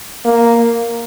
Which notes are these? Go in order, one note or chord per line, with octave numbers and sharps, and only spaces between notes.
A#3